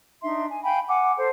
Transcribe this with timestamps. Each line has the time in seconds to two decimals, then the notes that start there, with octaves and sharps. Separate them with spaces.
0.23 D4 D#4 E5 C6
0.48 G#5
0.63 F5 G5 G#5 B5
0.88 F#5 G#5 D6
1.18 A4 C5